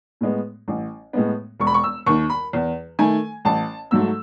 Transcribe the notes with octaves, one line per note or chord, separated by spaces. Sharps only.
A2 G#3 B3
A1
A2 G#3 B3
E1 C#6
B5
C#6
E6
D#2 D#3 C#6
B5
E2
D#3 A3 G#5
A1 A5
G#2 F#3 A3 E6